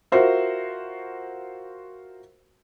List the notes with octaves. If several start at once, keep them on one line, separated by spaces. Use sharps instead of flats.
F4 F#4 A#4 C5 E5